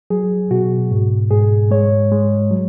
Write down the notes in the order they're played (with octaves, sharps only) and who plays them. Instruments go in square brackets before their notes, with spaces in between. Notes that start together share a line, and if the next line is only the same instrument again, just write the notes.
[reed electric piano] F#3 G#4
B2 F#4
G#2
G#2 G#4
G#3 C#5
G#3
F#3